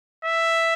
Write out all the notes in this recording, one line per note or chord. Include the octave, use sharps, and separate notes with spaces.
E5